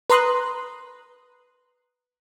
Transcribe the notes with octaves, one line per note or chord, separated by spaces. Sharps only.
B4 A#5 C6 D#6 F#6